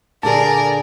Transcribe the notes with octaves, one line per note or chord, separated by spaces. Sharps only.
A#2 D3 G#4 A#4 D5 A5